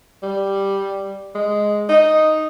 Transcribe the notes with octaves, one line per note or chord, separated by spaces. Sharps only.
G3
G#3
D#4